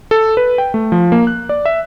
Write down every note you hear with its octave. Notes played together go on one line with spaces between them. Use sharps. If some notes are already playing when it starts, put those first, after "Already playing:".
A4
B4
G5
A3
F3
A#3
F#6
D5
E5